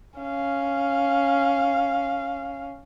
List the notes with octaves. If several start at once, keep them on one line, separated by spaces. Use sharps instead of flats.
C#4 F5